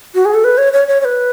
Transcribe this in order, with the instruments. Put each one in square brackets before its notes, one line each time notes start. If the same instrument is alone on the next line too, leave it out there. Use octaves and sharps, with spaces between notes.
[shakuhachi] F#4
G#4
A4
B4
C#5
C#5
C#5
C#5
B4